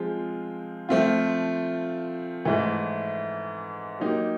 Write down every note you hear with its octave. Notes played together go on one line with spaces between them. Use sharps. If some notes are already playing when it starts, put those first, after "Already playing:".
Already playing: F3 G#3 C4 F4 G#4
F3 A3 C4 F4
G#2 E3 A3
F#3 A#3 D#4 G4